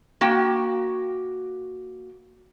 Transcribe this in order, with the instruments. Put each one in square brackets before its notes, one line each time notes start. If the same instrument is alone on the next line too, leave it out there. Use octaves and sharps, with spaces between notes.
[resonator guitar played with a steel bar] A#3 F#4 G5